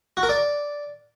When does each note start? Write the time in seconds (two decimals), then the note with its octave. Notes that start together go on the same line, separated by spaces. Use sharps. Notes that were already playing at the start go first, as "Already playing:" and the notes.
0.17 F#4
0.23 A#4
0.29 D5